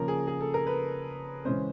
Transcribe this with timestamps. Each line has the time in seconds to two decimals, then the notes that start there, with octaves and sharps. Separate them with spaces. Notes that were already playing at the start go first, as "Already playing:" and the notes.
Already playing: C#3 F3 A#3 C#4 A#4
0.08 G#4
0.27 G#4
0.41 A4
0.54 A#4
0.67 B4
1.45 C#3 E3 G#3 C#4 C5